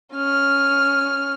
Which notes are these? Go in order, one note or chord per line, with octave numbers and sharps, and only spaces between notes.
C#4 F6